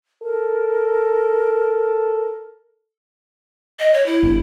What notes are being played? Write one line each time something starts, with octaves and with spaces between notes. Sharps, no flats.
A4 A#4
D#5
C#5
E4
G1